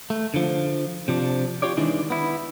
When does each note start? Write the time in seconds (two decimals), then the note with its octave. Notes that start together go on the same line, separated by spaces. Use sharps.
0.10 A3
0.34 D3 F3
1.08 C3 F3 D4
1.62 F4 G4 C#5 D5
1.77 D#3 E3 G#3 D4 E4
2.10 B3 E4